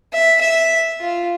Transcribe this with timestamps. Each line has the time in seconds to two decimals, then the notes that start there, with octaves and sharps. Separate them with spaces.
0.13 E5
0.41 E5
1.01 F4